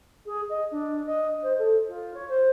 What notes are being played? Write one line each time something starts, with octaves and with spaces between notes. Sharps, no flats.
G#4
D#5
D4
D#5
C5
A4
F4
C#5
C5